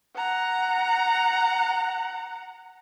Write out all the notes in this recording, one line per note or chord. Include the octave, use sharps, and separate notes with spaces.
F#5 A#5